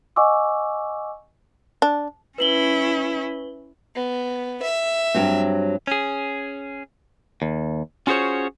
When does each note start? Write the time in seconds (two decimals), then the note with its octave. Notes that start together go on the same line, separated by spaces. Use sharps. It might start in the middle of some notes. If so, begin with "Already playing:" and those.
0.16 D#5 F#5 G#5 C#6 D6 E6
1.82 D4
2.38 C#4 E4 B4 F#7 G7
3.95 B3
4.62 E5
5.14 G2 F#3 C4
5.87 C#4 G#4
7.42 D#2
8.07 C#4 F4 F#4 G#4 C5 C#5